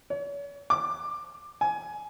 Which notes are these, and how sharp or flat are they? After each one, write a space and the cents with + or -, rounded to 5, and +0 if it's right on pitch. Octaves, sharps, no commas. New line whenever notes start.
C#5 +40
D6 +15
G#5 +20